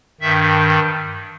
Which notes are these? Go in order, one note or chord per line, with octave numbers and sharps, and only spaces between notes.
G2 D#3 E5